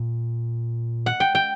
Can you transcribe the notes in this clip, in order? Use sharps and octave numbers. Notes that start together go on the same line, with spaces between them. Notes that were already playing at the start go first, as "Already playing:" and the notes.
Already playing: A#2
F#5
G5
G5